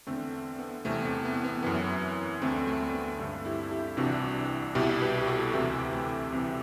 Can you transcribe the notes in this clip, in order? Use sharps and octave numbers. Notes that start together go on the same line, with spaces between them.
E2 D3 A3 C4
B3
E2 C3 E3 A3 C4
A3 C4
B3
B3
F#2 E3 B3
D2 D3 A3 C4
A3
B3
G2 D3 A3
E4 G4
E4 G4
C2 C3 E3 D4 F#4
C2 B2 E4 G4
G4 B4
G4
F#4 A4
D2 C3 E3 E4 G4
A3 C4
C2 C3 E3